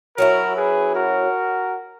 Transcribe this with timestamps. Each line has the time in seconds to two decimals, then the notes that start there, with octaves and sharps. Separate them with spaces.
0.17 F#3 C#4 E4 F#4 A#4
0.56 G#4 B4
0.95 F#4 A#4